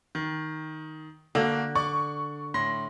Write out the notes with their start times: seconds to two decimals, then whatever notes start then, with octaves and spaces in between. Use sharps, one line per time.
0.15 D#3
1.35 D3 A#3 D4 F#4
1.75 D5 C#6
2.54 A2 C6 A#6